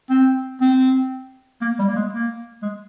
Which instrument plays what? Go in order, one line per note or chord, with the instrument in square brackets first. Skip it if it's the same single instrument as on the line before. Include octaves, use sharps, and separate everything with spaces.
[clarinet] C4
C4
A#3
G3
A#3
G#3
A#3
G#3